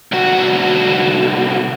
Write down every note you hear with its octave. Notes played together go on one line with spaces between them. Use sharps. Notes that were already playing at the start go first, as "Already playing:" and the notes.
C2 F#4